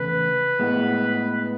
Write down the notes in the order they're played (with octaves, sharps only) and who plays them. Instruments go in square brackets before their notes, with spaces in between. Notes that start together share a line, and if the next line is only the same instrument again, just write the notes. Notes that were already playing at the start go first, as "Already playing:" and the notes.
Already playing: [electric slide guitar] E2 C#3 A3 [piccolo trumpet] B4
[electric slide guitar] A2 G#3 B3